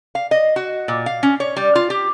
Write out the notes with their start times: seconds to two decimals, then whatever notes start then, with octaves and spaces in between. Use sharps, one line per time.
0.15 F5
0.31 D#5
0.56 F#4
0.88 A#2
1.06 F5
1.23 C#4
1.40 C#5
1.57 G3
1.75 F4
1.90 G4